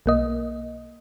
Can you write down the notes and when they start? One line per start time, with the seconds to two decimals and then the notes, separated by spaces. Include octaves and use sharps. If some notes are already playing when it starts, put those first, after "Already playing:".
0.06 B1 A#3 D#5